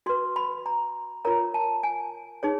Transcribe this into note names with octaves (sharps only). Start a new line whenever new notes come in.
F#4 B4 C6
B5
A#5
F4 A#4 C#5 A#5
A5
G#5
D#4 G#4 C#5